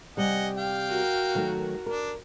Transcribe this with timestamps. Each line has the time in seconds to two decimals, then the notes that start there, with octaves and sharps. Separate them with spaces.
0.17 C3 G3 D#5 F#5 G#5
0.57 F5 G5
0.90 F#4 A#4
1.35 D#3 F#3 A3
1.86 D4 A#4